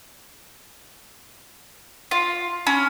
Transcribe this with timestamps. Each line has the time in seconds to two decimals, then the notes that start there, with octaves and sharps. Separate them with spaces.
2.11 F4
2.67 C#4